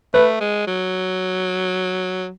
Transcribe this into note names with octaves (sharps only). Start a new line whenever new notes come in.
A3 B4
G#3
F#3